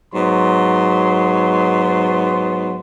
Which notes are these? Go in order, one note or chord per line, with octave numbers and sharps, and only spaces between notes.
G#2 F#3 B3 C6